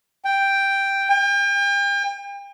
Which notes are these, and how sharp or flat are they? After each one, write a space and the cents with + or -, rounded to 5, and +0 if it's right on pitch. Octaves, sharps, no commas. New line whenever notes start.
G5 +5
G5 +40